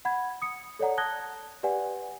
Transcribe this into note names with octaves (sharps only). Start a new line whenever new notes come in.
F#5 B5 G#6
D#6 C#7
A4 C#5 D5 F#5 A#5
A5 D#6 F#6 G#6 A#6 G7
G4 B4 D5 F#5 G#5